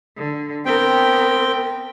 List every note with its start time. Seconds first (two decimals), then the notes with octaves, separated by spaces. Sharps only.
0.17 D3
0.65 B3 C4 A#4 G5